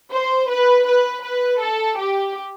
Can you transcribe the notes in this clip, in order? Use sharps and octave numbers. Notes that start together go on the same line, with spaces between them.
C5
B4
B4
B4
A4
G4